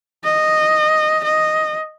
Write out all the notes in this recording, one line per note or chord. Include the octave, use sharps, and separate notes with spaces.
D#5
D#5